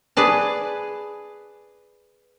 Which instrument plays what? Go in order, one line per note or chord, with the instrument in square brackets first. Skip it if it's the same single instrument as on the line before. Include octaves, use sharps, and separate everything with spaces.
[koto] G#4 B4 D5 A5